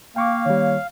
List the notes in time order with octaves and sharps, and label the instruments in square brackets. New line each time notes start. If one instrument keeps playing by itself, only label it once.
[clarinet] A#3 [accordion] F5 [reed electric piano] G5 C#6 D6
[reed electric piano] D#3 G3 [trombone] C#5